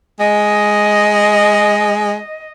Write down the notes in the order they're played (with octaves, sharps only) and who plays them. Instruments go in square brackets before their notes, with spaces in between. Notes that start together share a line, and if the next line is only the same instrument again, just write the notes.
[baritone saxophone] G#3 [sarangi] D#5